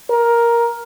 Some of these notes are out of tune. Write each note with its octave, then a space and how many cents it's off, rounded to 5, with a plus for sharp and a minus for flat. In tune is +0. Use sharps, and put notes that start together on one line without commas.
A#4 +10